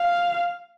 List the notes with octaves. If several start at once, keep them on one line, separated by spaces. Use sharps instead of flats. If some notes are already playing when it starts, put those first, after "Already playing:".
Already playing: F5